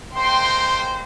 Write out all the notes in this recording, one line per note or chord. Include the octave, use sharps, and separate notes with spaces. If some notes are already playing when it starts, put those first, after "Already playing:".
G#3 A#3 C5 G5 C6